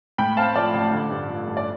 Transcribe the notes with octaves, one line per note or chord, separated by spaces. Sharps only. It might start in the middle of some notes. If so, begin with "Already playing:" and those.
A2 G5 B5
C4 F5 A5
F3 D5
A1
D3
G2
F3
G2
D5